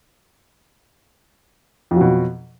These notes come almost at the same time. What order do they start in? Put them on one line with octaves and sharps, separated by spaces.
F2 F#3 B2